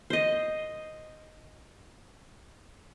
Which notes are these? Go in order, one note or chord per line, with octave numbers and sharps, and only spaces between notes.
C5 D#5